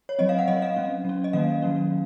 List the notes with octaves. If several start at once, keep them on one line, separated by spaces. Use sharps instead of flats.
C#5
F#3 C4 D#5
F5
F#5
F#3 C4 D#5
F5
F#3 C#4
F#3 C#4
D#5
D#3 F#3 A#3 C#4 F5
D#3 F#3 A#3 C#4